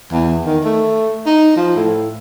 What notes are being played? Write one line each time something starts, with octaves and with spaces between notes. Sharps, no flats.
E2
D#3
A3
D#4
F3
A2